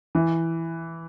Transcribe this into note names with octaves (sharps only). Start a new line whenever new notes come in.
E3